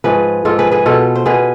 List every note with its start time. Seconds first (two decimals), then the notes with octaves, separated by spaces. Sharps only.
0.04 G#2 F3 G#4 B4
0.45 G#2 F3 F4 A4
0.59 G#4 B4
0.72 G#4 B4
0.86 B2 F4 A4
1.15 C5
1.26 B2 G#4 B4